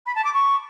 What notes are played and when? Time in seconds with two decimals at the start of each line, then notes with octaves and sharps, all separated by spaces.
0.06 B5
0.15 A5
0.24 D6
0.33 C#6